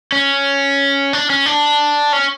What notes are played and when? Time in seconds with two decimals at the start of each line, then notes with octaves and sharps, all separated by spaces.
0.12 C#4
1.13 D4
1.30 C#4
1.46 D4
2.13 C#4